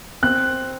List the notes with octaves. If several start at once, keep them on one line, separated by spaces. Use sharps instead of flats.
C4 F#6